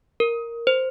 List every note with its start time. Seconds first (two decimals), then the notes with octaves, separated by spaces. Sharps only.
0.20 A#4
0.67 C5